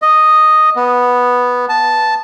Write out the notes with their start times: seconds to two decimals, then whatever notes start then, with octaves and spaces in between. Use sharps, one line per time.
0.02 D#5
0.76 B3
1.69 A5